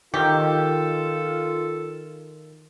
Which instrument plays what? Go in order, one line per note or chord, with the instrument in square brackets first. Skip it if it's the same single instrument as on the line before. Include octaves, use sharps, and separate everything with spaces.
[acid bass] D#3 [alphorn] F4 [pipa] G4 [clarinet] A4